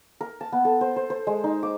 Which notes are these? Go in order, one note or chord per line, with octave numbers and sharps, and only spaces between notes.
A#4
A5
B3
A4
C5
C5
C5
G#3
D#4
D6